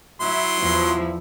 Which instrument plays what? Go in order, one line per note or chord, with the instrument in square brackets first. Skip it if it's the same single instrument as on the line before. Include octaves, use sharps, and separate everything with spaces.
[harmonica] F#3 C6 [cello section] E4 E5
[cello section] E2 F3 E4